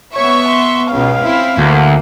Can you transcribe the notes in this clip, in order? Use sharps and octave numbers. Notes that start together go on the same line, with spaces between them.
B3 C#5 E5 C#6
C6
C#2 B2 F5
C4 E4
D2 A#3